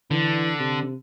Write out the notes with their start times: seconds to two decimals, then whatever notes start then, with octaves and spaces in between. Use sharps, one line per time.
0.11 D3 E3
0.59 C3